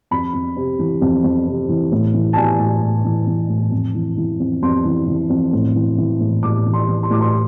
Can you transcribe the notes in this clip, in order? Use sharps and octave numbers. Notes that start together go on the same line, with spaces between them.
F2 B5
F2
C3
E3
F2
F2
C3
E3
A2
E3
A5
E3 G#5
A2
A2
E3
E3
A2
F2
E3
E3
F2
F2 C6
E3
E3
F2
A2
E3
E3
A2
A2 D6
E3
C6
E3
C6
A2 D6
C6